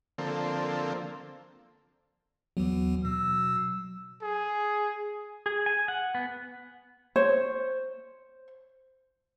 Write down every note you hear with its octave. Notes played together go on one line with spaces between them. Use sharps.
D3 F3 A#3 C4 A4
D#2 E3 F#3 B3
B2 E6
G#4
G#4
G#5
F#5
B3
C5 C#5